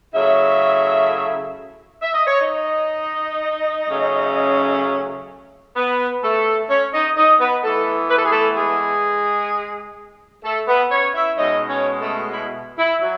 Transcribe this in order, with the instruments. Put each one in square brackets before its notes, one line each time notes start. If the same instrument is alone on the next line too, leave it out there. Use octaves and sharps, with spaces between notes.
[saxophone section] C#3 F#3 A3 E4 E5
E5
D#5
C#5
D#4 D#5
C#3 F#3 A3 C#4
B3 B4
A3 A4
C#4 C#5
D#4 D#5
D#4 D#5
B3 B4
E3 A3 B3 A4
B4
A4
G#4
A3 A4
G#3 G#4
A3 A4
B3 B4
C#4 C#5
E4 E5
B2 G#3 C#4 D#4 D#5
C#4 C#5
A3 A4
E4
E4
F#3